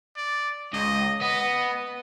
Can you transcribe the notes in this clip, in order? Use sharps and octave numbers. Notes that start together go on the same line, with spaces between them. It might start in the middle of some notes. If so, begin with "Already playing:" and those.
D5
C#2 D#5
B3 D#5